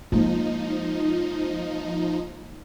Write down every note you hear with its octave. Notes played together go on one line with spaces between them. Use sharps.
F3 G#3 A#3 D#4